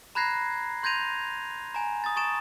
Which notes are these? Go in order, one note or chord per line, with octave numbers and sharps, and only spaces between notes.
A#5 B5 F#6 G#6 A#6 C7
C6 G6 G#6 A#6 D#7 F7
G#5 A#5
D#6 A6
A5 C#6 D#6 A6 D7 E7